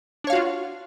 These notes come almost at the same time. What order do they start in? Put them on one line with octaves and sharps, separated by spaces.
D4 C#5 F5 F#4 F4